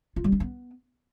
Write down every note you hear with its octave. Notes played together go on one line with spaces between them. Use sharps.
F4
G3
D4
B3